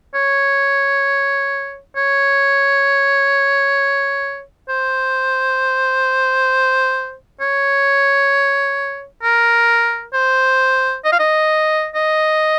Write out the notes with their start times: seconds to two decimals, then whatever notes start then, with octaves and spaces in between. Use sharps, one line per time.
0.15 C#5
1.96 C#5
4.69 C5
7.41 C#5
9.23 A#4
10.13 C5
11.05 D#5
11.12 F5
11.19 D#5
11.95 D#5